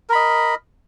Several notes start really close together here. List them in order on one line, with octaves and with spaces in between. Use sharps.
A#4 B5 D#5